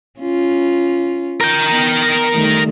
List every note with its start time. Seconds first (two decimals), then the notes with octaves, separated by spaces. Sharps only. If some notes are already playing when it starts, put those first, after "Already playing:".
0.20 C#4 F4
1.41 A#4 G5
1.71 B3
2.33 D#3 G3 A3